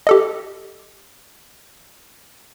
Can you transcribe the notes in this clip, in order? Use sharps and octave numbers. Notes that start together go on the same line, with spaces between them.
G4 A4 D#5